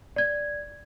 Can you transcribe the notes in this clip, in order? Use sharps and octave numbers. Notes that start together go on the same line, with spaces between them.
D5 G#6